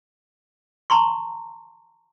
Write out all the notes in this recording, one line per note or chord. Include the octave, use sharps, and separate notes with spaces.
A5 A#5 C6 C#6